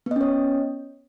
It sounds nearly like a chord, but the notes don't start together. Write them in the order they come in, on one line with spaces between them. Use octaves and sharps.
B3 D#5 C#4 C#5